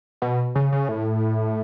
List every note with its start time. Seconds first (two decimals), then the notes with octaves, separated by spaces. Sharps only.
0.22 B2
0.55 C#3
0.72 C#3
0.89 A2